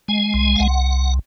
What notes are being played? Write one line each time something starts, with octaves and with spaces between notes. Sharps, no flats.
G#3 G#5
C2
F5
C2 F#5